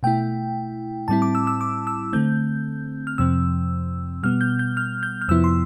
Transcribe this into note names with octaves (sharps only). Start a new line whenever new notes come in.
B2 A3 E4 G5
A2 G3 C4 E4 A5
D6
E6
E6
D6
E6
D3 A3 C4 G6
F6
F2 C3 F3 C4 E6
B2 G3 B3 F6
G6
G6
F6
G6
F6
F2 C3 F3 B3 E4 E6
C6